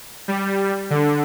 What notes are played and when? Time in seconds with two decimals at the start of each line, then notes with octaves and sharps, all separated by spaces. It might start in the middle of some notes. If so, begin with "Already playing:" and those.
0.28 G3
0.90 D3